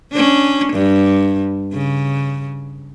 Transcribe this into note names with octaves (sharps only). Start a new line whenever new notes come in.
C#4 D4
G2
C#3